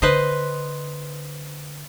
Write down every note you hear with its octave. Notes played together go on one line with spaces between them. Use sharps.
D3 B4 C5 D#5